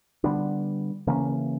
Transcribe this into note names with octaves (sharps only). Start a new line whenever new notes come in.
D3 G3 B3 D4
C#3 E3 A#3 C#4